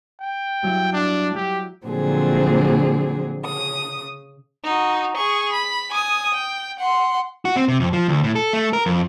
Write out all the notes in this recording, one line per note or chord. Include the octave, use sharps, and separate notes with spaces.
G5
G2 F#3 E4
D4
F#3 G4
A#2 D3 F3 F#3 C4 G#4
C#3 D#6
D#4 F#4
G#4 C#6
B5
G#5 D#6
G5
F#5 C6
F#4
C4
C3
F2
F3
D2
A2
A4
A3
A#4
F2